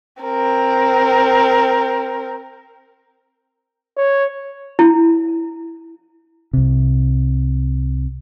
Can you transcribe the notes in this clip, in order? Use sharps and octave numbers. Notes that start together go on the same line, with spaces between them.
C4 A#4
C#5
E4
C2 C3